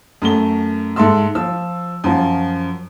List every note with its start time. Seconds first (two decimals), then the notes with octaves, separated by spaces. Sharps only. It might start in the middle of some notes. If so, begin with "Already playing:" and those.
0.22 F#2 A3 G7
0.96 G#2 A4 E5 C6 E6
1.35 F3 E6
2.04 F#2 F3